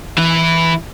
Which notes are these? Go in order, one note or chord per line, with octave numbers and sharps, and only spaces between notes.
E3 E4